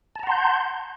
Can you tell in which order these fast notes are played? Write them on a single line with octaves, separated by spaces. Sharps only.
A5 A#5 F#5 C6 G6